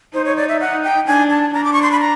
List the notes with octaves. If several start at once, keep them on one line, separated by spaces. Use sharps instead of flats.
D#4 C5
C#5
D5
E5
F#5
G5
D4 G#5
A5
D4 A#5
D6
C#6
C6
B5
A#5